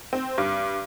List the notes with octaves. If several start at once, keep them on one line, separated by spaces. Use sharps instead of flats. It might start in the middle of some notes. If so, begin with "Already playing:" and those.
C4
G2